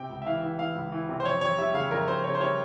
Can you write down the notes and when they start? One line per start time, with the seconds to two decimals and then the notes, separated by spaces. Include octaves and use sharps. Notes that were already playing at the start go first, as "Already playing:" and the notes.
Already playing: C3 G5
0.09 C#2
0.22 E5
0.26 E3 F5
0.42 E3
0.58 E3 F5
0.75 C#2
0.92 E3
1.09 C3
1.20 C5
1.25 F2 C#5
1.41 F2 C#5
1.58 G3 E5
1.74 C#3 F5
1.91 F2 A#4
2.08 F2 C5
2.24 C#3 C#5
2.35 C5
2.41 G3 C#5